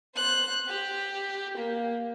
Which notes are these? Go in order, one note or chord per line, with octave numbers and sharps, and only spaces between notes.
C5 F#6
G4
A#3